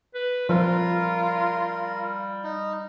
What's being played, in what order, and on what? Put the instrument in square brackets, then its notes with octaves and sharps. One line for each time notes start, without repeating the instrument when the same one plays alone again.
[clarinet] B4
[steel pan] F3 [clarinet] G3 [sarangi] F4 [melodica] A#4
[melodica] D#4